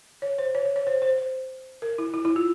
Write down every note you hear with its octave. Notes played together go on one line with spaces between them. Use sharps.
C#5
C5
C#5
C#5
C#5
C5
C5
C5
A#4
E4
E4
E4
F4